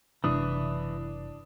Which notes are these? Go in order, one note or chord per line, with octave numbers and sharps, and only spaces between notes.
F#1 C3 E3 G#3 D4 D#6